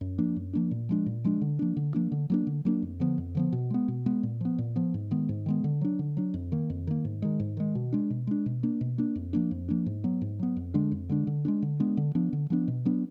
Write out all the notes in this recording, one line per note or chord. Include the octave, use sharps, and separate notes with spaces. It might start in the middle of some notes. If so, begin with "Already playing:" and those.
F#2
F3 A#3 D4
F#2
F3 A#3 D4
A#2
F3 G#3 D4
A#2
F3 G#3 D4
D3
F3 A#3 D4
D3
F3 A#3 D4
D3
F#3 A#3 D4
D3
F#3 A#3 D4
F2
D3 F3 B3
F2
D3 F3 B3
B2
G#3 B3
B2
G#3 B3
A#2
F3 B3
A#2
F3 B3
G#2
D#3 G#3 B3
G#2
D#3 G#3 B3
D3
F#3 D4
D3
F#3 D4
F2
D#3 A#3
F2
D#3 A#3
G#2
D#3 G#3
G#2
D#3 G#3
B2
G#3 D4
B2
G#3 D4
B2
A#3 D4
B2
A#3 D4
F2
F3 A#3 D4
F2
F3 A#3 D4
G#2
F#3 B3
G#2
F#3 B3
F2
D3 G#3 D4
F2
D3 G#3 D4
D3
G#3 B3 D4
D3
G#3 B3 D4
D3
F3 B3 D4
D3
F3 B3 D4
B2
F#3 B3 D4